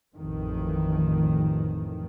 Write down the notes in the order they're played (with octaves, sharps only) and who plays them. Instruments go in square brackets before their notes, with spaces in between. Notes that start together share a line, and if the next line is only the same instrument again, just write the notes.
[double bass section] A1 F2 D#3